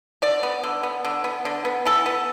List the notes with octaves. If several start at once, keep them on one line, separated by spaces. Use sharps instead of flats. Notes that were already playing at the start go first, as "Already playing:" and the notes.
D3 D5
B3
D3
B3
D3
B3
D3
B3
E3 A4
B3